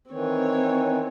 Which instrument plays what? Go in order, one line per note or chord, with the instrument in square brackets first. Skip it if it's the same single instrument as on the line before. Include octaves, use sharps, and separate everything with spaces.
[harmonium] D#3 E3 [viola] C4 C#5